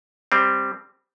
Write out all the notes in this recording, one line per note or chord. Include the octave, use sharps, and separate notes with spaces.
G3 C4